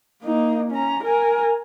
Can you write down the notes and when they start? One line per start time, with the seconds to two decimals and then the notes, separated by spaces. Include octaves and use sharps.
0.23 A#3 D#4
0.71 C#4 A#5
1.04 A#4 G#5